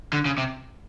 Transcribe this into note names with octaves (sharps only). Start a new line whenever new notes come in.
D3
C#3
C3